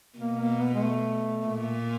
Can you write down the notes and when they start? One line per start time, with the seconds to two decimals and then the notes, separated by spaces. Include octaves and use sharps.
0.18 B2 A#3
0.41 A#3
0.61 B3
0.74 G#3
0.82 A3
1.46 A#2